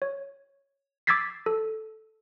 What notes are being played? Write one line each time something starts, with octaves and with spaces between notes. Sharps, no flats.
C#5
D6 E6 G#6 A6 B6 C7
A4